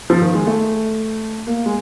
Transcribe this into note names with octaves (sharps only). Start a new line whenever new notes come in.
F3
D#3
G#3
A3
A#3
G#3